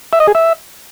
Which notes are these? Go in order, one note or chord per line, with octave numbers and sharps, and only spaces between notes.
E5
D#5
G#4
E5